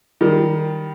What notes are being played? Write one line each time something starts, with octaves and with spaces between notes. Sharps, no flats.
D#3 G3